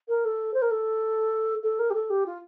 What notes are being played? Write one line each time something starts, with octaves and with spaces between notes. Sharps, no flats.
A#4
A4
C5
A#4
A4
A4
A#4
G4
A4
G4
F4